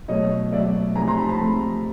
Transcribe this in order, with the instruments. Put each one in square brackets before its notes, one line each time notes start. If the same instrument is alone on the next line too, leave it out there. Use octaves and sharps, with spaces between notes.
[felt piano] B2 F#3 A3 C#5 D#5
B2 F#3 A3 D5 E5
C3 F3 A3 G#5 A#5
A#5 C6
A5 B5
A5 B5
C3 F3 A3